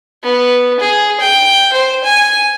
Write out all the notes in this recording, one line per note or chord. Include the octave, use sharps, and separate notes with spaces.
B3
G#4
G5
C5
G#5